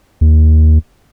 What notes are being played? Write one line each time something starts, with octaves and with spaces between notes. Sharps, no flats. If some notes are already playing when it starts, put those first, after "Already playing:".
D#2